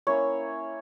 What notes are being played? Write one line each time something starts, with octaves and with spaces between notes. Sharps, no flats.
A#3 C#4 E4 C#5